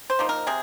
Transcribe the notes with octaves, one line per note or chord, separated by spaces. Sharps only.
C5
F3 A#3 D#4
A#4
C3 G#4